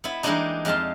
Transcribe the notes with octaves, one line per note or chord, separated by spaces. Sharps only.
B3 E4
E3 G3 G#3 A#3 D4 D#4
F2 G#3 F5 A5 C6